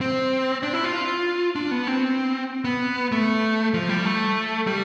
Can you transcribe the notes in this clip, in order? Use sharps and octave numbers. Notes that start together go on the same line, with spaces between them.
C4
D4
E4
F4
D4
B3
C4
B3
A3
F3
G3
A3
G3